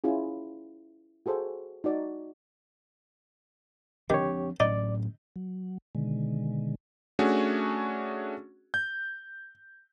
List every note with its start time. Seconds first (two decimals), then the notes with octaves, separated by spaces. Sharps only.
0.04 C#4 E4 F4 G#4
1.26 F#4 G#4 A4 C5
1.84 D#4 F#4 D5
4.10 D#3 F3 C4 D4 G4 C#5
4.60 A2 F#3 C#4 D#4 D5
5.36 F#3
5.95 B2 D3 D#3 G#3
7.19 A3 C#4 D4 F#4 G#4
8.74 G6